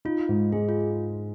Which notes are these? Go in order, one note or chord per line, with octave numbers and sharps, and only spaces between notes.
D#4 F4
G#2
G#3 G#4
F4